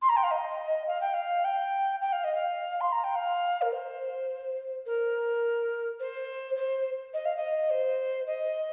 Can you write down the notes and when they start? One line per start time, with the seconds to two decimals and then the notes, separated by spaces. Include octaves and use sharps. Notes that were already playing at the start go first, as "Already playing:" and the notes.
0.02 C6
0.09 A#5
0.16 G5
0.23 F5
0.31 D#5
0.87 F5
1.01 G5
1.14 F5
1.44 G5
2.01 G5
2.12 F5
2.24 D#5
2.34 F5
2.81 C6
2.92 A#5
3.04 G5
3.15 F5
3.62 A#4
3.72 C5
4.86 A#4
6.00 C5
6.56 C5
7.13 D#5
7.25 F5
7.36 D#5
7.70 C5
8.27 D#5